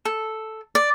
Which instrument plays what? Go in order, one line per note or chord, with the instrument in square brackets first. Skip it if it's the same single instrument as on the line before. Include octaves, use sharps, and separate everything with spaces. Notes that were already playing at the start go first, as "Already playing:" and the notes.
[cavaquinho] A4
D5